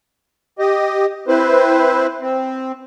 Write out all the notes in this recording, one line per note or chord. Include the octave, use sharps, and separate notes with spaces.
G4 D#5
C4 E4 B4 C5
C4